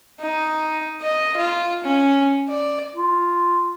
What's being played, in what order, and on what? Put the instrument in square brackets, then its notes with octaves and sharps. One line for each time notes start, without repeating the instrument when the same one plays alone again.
[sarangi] D#4
D#5
F4
C#4
D5
[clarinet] F4